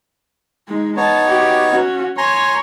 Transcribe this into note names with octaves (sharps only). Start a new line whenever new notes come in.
G#3 D#4
B3 D#4 C#5 A5
F#4 G4
C#4 F#4
C#5 G#5 A#5 C6